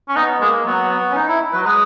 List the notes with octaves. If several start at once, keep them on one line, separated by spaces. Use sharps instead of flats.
C#4
B3 D#4
G#3 A#3
F#3 B3
B3
C#4
D#4
E4
F#3 B4
G#3 B4